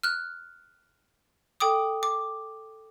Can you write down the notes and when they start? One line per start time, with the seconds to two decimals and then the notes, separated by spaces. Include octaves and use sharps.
0.03 F6 F#6
1.60 A4 G5 D6 D#6
2.03 D6